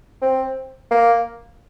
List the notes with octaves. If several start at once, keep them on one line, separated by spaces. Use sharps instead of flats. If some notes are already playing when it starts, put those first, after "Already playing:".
C4
A#3